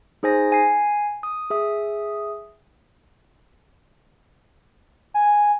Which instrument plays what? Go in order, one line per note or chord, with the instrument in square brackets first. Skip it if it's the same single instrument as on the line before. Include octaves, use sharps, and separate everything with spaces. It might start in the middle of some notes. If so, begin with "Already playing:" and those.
[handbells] D#4 G#4 C5 G#5 A#6
G#5 C7
D#6
G#4 E5 D#6
[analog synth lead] G#5